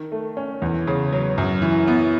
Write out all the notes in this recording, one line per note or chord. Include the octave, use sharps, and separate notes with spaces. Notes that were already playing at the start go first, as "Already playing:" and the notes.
Already playing: D#3
A3
C#4
E2
C#3
F#3
F#2
E3
B3